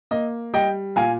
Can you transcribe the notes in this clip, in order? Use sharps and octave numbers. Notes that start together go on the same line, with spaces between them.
A#3 D#5
G3 D#5 G5
A#2 F5 G#5